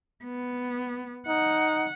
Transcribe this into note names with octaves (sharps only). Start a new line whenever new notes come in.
B3
D#4 F#5